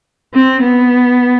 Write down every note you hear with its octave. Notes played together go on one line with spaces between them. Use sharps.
C4
B3